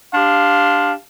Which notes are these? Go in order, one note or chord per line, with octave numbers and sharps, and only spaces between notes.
D4 G4 F5 C6